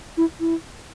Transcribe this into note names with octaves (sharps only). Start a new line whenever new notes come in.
E4
E4